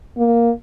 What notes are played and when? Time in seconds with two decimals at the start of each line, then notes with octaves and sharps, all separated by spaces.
0.17 A#3